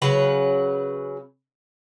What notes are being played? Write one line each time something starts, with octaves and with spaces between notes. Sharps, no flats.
C#3 F#3 B4